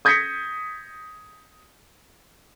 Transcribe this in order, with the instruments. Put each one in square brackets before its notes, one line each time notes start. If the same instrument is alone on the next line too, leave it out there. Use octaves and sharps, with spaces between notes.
[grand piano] D#6 G6 G#6 A#6 B6 C#7